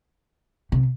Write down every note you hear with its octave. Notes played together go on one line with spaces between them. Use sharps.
C3